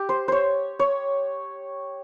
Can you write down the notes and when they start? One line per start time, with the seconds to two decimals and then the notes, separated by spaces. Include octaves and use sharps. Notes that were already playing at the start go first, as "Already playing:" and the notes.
Already playing: G4
0.09 C5
0.28 C5 C#5
0.79 C#5